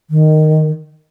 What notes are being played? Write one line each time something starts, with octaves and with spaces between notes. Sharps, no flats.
D#3